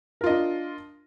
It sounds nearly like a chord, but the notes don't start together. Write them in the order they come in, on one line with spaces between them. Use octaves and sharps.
A#4 F4 D#5 D4